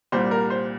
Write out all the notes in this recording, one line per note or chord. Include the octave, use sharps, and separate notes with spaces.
C2 A#2 G3 C5
A#4
C5